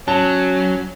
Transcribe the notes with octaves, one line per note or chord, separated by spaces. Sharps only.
F#3 C#4 A5